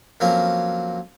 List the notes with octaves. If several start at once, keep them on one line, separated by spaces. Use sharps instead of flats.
F2 F#3 A#3 C#4